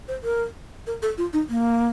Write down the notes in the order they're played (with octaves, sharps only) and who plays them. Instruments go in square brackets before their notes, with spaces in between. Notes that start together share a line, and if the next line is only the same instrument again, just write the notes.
[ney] C5
A#4
A#4
A4
F4
D#4
A#3